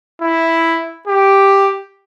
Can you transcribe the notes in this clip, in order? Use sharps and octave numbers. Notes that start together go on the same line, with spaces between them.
E4
G4